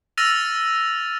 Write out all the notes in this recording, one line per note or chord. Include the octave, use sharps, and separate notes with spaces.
E6 F6 A6 A#6 D#7 F7